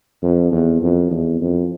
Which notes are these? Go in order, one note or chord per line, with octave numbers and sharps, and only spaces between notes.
F2
E2
F2
E2
F2